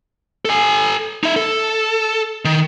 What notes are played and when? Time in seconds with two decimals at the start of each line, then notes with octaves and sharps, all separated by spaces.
0.45 A4 G#5
1.24 D#4 E5
1.36 A4
2.45 D#3